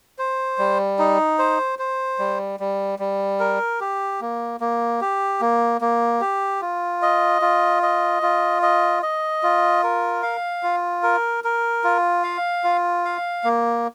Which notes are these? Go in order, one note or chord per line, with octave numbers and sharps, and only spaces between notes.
C5
G3
D#4
C5
C5
G3
G3
G3
A#4
G4
A#3
A#3
G4
A#3
A#3
G4
F4
D#5
F4
D#5
F4
D#5
D#5
F4
A#4
F5
F4
A#4
A#4
F4
F5
F4
F5
A#3